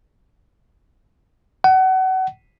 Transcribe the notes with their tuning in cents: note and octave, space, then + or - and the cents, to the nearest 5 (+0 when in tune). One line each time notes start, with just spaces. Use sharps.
F#5 +30